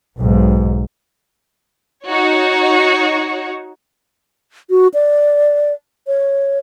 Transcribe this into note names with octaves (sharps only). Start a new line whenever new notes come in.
B1 G#2
D#4 F#4 C#5
F#4
D5
C#5